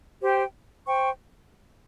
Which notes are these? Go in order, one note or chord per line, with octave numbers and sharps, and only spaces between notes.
G4 C5 G5
C5 G5 C#6